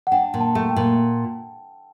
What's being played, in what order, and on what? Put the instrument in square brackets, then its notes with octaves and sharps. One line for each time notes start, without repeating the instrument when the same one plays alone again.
[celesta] F#5
[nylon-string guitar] D4 [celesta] G5
[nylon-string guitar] A#2
[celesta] A5
[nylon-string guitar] A3
[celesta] G5
[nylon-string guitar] A#2